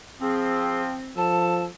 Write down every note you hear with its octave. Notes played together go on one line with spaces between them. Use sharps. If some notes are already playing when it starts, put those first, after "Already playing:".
F3 C4 G#4
F3 A4 A5